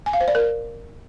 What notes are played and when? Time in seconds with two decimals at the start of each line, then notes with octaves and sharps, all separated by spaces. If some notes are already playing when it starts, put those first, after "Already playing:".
0.06 G#5
0.13 F5
0.21 C5
0.28 D5
0.35 A#4